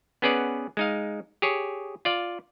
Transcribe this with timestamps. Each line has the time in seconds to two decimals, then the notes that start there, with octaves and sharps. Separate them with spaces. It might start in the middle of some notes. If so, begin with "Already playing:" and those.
0.22 B3 C#4 G#4 B4 D5 F#5
0.77 G#3 D#4 F5
1.42 G4 G#4 C#5
2.05 F4 D5 F5